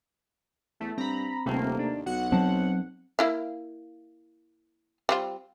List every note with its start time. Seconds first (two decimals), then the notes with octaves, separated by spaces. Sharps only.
0.80 E2 A3
0.98 G2 C4 A#5 B5
1.46 D#1 C3 A3 A#3
1.79 D#2 D4
2.06 B1 F#4 F#5
2.32 F#3 C4 C5 A5
3.19 A#3 E4 F5
5.09 G3 C4 F4